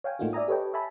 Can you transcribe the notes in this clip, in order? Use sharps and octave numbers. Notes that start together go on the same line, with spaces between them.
C#5 F5 G5 G#5
A2 A3 A#3 D#4 F4 F#4
D5 E5 G#5 A#5 D#6
G4 A4 B4 C#5 D#5 G5
E5 G#5 A5 B5